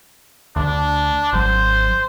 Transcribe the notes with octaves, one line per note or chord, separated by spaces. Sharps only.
D2 D3 D4
G#1 F#3 C5